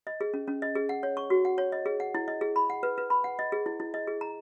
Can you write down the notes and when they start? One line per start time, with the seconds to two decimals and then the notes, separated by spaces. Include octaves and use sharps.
0.07 D#5
0.21 G#4
0.34 C#4
0.47 C#4
0.62 D#5
0.75 G#4
0.89 F#5
1.03 C#5
1.17 C#6
1.30 F#4
1.45 F#5
1.58 C#5
1.72 D#5
1.86 G#4
2.00 F#5
2.15 E4
2.28 D#5
2.41 G#4
2.56 B5
2.70 F#5
2.83 B4
2.98 B4
3.10 B5
3.24 F#5
3.39 D#5
3.52 G#4
3.66 E4
3.80 E4
3.94 D#5
4.07 G#4
4.21 A#5